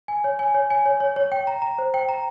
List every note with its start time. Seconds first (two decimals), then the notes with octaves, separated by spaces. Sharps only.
0.08 G#5
0.24 C#5
0.39 G#5
0.55 C#5
0.70 G#5
0.86 C#5
1.00 C#5
1.16 C#5
1.32 G5
1.47 A#5
1.62 A#5
1.78 C5
1.94 G5
2.09 A#5